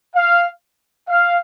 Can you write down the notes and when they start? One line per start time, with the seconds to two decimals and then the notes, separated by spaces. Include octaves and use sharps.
0.16 F5
1.09 F5